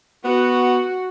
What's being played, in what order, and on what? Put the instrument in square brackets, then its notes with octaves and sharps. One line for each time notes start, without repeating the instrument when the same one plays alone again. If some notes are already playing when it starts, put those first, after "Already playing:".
[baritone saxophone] B3 [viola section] F#4